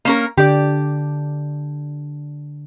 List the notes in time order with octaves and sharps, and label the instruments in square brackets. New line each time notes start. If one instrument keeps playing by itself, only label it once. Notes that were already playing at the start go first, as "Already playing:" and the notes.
[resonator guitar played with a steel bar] A#3 C#4 A#4
[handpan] D3 D4 [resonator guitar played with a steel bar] G4 D5